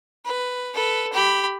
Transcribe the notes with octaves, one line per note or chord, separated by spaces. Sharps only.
B4
A4 B4
G4 B5